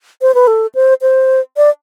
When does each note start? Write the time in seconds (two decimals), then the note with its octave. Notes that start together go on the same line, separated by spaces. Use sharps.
0.22 C5
0.34 B4
0.47 A4
0.75 C5
1.02 C5
1.57 D5